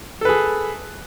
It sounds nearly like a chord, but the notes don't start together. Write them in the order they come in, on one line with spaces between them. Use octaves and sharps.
A4 B4 G#4